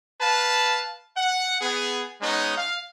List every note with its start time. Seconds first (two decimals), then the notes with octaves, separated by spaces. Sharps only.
0.21 B4 F5 A5
1.16 F#5
1.61 B3 G#4
2.22 G#3 B3 C#4 D#4
2.57 F5